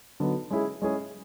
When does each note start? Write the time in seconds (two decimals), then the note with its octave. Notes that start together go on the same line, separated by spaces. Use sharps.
0.20 D3 F#3 B3 D#4
0.51 G#3 C#4 E4 G#4
0.82 G#3 C#4 E4 G#4